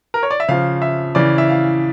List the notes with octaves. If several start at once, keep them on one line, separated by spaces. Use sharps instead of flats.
A#4
C#5
D5
E5
C#3 F3 F5
E5
C#3 E3 D5
E5
F5